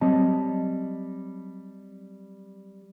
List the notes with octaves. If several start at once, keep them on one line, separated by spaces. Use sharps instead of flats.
F#3 G3 C4 D#5 A5